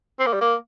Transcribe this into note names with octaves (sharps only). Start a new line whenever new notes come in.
C4
A#3
G3
A#3